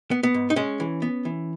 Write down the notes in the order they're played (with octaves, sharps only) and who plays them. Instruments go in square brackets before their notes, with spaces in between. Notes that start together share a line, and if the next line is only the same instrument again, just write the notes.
[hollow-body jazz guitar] B3
B3
G#2
D#4
G#3 C#4
E3
B3
E3